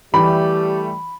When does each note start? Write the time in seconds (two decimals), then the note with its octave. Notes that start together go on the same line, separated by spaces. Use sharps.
0.14 E3 G3 A3 G4 B5